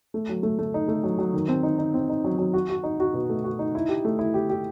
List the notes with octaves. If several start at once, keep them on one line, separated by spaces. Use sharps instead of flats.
A3
F#3
A3
A3
D#4
A3
F#3
F#3
D#3
C4
D#4
D#4
C4
D#4
F#3
F#3
F#4
F#4
D#4
F#4
B2
A3
F#4
D#4
E4
G4
A3
E4
G4
G4